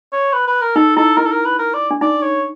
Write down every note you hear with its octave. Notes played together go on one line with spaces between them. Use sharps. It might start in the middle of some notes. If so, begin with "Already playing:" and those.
C#5
B4
B4
A#4
D#4 A4
E4 A4
E4 A#4
A4
A#4
B4
A#4
D5
D4
D#4 D5
C#5